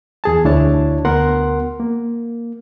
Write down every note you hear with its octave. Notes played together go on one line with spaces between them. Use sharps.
E2 G#4 A5
D2 D4 E4 C#5 A5
D2 B3 A#4 F#5 C6
A#3